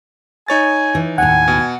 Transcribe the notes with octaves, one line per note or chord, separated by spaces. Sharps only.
D#4 C#5 G#5 A6
E3
D#2 A2 F#5 G#5
B2